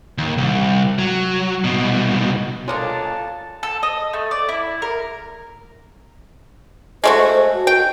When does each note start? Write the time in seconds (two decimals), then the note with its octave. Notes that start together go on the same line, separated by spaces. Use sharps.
0.18 D#2
0.38 C2
0.99 F#3
1.64 C2 B2
2.68 G#3 A#3 D4 F4 A4 A#4 C#5 A5
3.63 A4
3.83 D#5
4.13 A3
4.31 D5
4.49 E4
4.82 A#4
7.04 G#3 A3 F#4 C5
7.54 F#4
7.67 G5